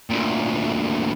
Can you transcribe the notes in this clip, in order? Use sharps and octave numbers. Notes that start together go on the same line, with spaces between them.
D2 A#2